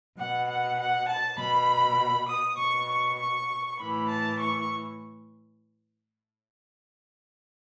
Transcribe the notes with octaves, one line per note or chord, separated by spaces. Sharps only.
B2 F#5
F#5
F#5
A5
B2 B5
D#6
B2 C#6
C#6
C#6
A2 E3 B5
A5
C#6